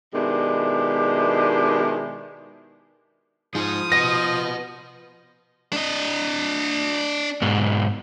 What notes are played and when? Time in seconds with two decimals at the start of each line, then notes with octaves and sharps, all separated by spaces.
0.14 B2 D#3 G#3 D4 E4 G4
3.55 F3 D#4 G#4 D#6
3.92 B4 D#5 F#5 A#6
5.73 D4 D#5
7.42 G#2 B2